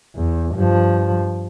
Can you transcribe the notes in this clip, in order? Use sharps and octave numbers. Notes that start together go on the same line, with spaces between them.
E2
G2 F3